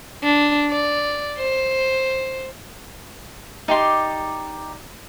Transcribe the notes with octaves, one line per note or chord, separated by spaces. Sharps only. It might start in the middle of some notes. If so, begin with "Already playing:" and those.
D4
D5
C5
D#4 G4 D5 C6